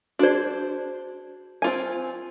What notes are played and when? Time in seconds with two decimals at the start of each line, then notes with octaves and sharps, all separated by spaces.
0.19 D4 F#4 G#4 C5 D5
1.62 C4 F4 G#5